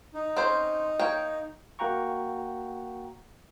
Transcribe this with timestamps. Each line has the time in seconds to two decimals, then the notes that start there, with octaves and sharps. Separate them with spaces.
0.14 D#4
0.36 C4 C#4 C5
0.99 A#3 C#5 G5
1.79 A#3 F#4 F#5 G5 A#5 C#6